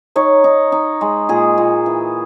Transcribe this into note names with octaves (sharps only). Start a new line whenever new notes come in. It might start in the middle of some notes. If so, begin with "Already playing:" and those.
D#4 C#5
D#4
D#4
G#3
A#2 G#4
A#2
E3